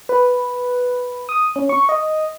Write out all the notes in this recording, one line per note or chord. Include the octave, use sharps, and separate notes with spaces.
B4
D#6
C#4
C#6
D#5